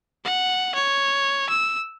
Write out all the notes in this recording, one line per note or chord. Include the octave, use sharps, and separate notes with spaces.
F#5
C#5
E6